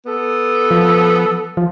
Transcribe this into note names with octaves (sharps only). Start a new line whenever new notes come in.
B3 A4
F3
F3